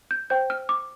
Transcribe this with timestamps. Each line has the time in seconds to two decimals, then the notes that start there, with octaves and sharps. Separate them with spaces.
0.11 G6
0.30 C5 G5 G6
0.50 F6
0.69 D6